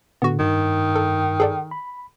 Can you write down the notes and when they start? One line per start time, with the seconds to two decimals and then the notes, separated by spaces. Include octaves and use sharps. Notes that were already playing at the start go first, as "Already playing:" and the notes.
0.22 A2 D3 B3 F#4
0.39 G2 D#3
0.95 A4
1.40 G#4 A4 D5
1.71 B5